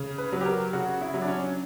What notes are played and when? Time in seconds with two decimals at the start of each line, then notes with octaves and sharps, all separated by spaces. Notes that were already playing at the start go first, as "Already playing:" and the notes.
Already playing: C#3
0.18 B4
0.32 F#3
0.41 G4
0.46 A#4
0.73 C#3 F#4
1.01 E4
1.14 F#3
1.22 D4
1.28 C#4